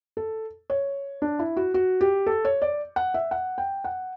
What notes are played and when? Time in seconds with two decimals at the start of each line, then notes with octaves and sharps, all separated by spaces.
0.17 A4
0.70 C#5
1.22 D4
1.39 E4
1.57 F#4
1.74 F#4
2.01 G4
2.27 A4
2.45 C#5
2.62 D5
2.96 F#5
3.14 E5
3.31 F#5
3.58 G5
3.84 F#5